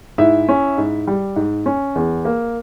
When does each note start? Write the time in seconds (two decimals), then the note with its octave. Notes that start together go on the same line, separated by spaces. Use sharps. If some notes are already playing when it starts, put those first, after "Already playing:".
0.18 G#2 E4 E5
0.49 C#4
0.78 G#2
1.07 G3
1.36 G#2
1.66 C#4
1.95 E2
2.25 A#3